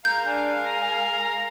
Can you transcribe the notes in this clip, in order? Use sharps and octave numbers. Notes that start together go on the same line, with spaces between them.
G#3 A#4 F5 A#5 G6
D4 G#5
A#5